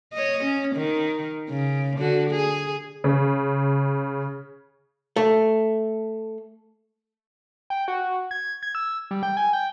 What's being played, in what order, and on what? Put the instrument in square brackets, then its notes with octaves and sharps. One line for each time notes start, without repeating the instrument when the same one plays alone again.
[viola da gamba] C#5 D#5
C#4
D#3
C#3
D3 F#4
G#4
[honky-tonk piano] C#3
[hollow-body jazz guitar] A3
[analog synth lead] G5
F#4
G#6
G#6
E6
G3
G5
G#5
G5